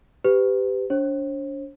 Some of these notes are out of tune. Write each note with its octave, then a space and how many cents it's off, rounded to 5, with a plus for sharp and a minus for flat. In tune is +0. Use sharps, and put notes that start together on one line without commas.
G4 +0 B4 +30
D4 -35 C5 +45